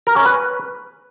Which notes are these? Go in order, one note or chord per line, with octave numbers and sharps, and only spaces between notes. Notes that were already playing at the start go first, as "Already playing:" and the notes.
A#4
C#4
B4